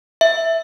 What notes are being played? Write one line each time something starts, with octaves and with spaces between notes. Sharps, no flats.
E5